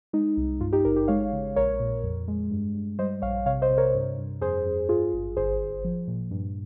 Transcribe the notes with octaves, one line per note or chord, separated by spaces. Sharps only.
G#3 D#4
C2
G2 F4
D#4 G4
G#1 G4 A#4
G4 A#4
G#3 C#5 F5
C#3
A#1 A#4 C#5
A#2
F2
G#3
G2
G2
G3 C5 D#5
A#1 C#5 F5
C3 C#5 F5
C5 D#5
C3
A#4 C#5
G2
G2
F2 G#4 C5
F2
G2 F4 G#4
G#1
G1 G#4 C5
G1
F3
A#2
G2